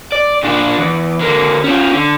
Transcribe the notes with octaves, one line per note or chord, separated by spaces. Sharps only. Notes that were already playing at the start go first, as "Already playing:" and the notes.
D5
A#2 D4
E2
D3 A#3
F3 C#4
D3